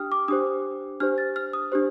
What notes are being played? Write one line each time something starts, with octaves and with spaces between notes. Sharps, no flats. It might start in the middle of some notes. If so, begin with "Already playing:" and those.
Already playing: D4 G4 G5 D#6 F6
D6
D4 G4 C5 D#6
D4 G4 C5 F6
A6
F6
D#6
D4 G4 C5